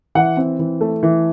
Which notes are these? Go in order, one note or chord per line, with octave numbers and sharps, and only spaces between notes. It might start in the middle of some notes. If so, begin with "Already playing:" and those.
E3 F#5
C4
E3
A3
E3